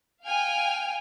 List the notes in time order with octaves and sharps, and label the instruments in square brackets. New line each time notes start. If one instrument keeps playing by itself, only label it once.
[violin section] F5 G5 G#5 F6